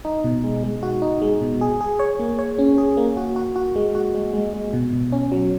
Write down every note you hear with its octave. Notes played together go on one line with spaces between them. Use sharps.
D#4
B2
G#3
G#3
F#4
D#4
G#3
B2
G#4
G#4
C#5
A#3
C#5
C#4
G#4
A#3
F#4
F#4
F#4
G#3
F#4
G#3
G#3
G#3
B2
B2
C#4
F#3